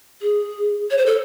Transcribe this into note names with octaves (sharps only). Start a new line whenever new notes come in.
G#4
C#5
C5
A4